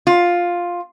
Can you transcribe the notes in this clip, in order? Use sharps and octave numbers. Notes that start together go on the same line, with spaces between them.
F4